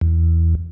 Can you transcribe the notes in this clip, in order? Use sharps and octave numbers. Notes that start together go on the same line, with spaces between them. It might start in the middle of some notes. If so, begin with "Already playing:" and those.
E2